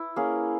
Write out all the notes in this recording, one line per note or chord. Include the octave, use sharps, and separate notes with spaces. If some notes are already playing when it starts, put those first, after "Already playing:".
Already playing: E4
A#3 C#4 G#4